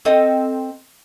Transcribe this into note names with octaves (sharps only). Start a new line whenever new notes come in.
C4 A4 D#5